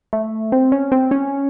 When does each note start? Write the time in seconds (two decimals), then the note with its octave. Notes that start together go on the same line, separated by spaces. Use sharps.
0.13 A3
0.52 C4
0.72 C#4
0.92 C4
1.11 C#4